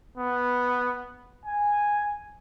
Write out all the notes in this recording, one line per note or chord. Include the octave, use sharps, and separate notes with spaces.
B3
G#5